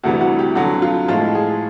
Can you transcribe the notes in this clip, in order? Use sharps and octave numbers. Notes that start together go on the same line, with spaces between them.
D2 C3 E3 G3 F#4
F#4
G4
F2 D3 F#3 F#4
F4
A2 F3 G#3 F4
G#4